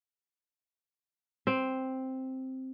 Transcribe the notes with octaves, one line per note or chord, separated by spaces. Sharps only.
C4